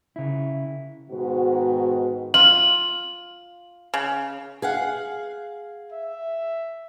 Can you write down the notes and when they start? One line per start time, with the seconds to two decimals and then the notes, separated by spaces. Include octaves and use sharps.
0.16 C#3 E4
1.10 G#2 B2 D#3 F#4
2.34 F4 F#7
3.94 C#3
4.62 G#4 F5 F#5
5.92 E5